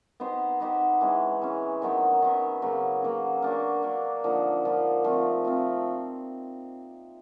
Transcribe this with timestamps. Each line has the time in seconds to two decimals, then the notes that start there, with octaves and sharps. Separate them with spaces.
0.20 B3 D#4 G4 C5
0.60 B3 D#4 G4 C5
1.01 E3 G#3 C#4
1.42 E3 G#3 C#4
1.82 D#3 F#3 B3 D#4
2.22 D#3 F#3 B3 D#4
2.62 C#3 F#3 A#3
3.02 C#3 F#3 A#3
3.42 A#3 D4 F#4
3.83 A#3 D4 F#4
4.24 D3 F3 A#3 D#4
4.64 D3 F3 A#3 D#4
5.04 F3 A3 C4
5.45 F3 A3 C4